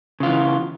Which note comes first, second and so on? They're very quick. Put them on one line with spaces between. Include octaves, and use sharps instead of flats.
C#3 F4 E3